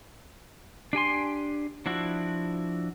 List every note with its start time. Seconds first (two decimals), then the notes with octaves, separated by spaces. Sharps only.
0.93 D4 G4 G#5 C6
1.86 F3 D4 E4 F#4